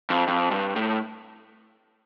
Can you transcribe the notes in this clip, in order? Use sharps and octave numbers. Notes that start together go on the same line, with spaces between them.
F2
F2
G2
A2